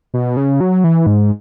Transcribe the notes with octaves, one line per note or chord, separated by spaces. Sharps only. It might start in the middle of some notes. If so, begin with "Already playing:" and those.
B2
C#3
F#3
E3
G#2